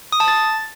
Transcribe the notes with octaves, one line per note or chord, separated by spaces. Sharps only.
D#6
A5
A6